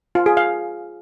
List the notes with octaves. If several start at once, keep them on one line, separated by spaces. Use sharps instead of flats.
F4
G#4
F5